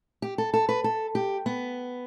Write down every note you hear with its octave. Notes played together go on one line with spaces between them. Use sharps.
G4
A4
A4
B4
A4
G4
B3